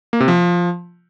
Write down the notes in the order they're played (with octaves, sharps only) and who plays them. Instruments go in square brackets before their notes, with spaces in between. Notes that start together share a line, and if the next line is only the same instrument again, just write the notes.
[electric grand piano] A#3
C3
F3